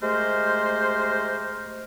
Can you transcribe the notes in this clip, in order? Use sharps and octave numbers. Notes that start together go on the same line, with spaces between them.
G#3 A3 G4 A#4 C5